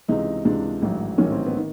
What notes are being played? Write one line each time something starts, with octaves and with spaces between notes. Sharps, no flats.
C#2 C3 E3 G#3 D#4
C#2 C3 E3 G#3 D4
A1 G#2 D#3 F#3
A1 G#2 D#3 F#3 C#4
C4
B3
D#3